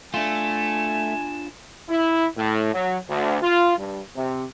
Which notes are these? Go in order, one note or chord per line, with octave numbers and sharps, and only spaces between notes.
A3 D4 F4 G#5 E7
E4
A2
F#3
D2
F4
G2
C3